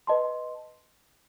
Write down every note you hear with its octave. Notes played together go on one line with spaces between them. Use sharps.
B4 D#5 A5 C6